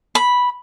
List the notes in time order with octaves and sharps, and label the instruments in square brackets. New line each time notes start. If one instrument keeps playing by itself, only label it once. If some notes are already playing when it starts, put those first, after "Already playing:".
[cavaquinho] B5